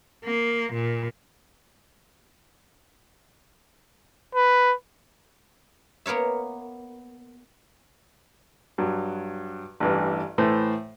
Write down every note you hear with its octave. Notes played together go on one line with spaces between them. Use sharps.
A#3
A#2
B4
A#3 B3 A#4 C#5 E5
G2 F#3
A1 G2 E3
A2 E3 A3 C5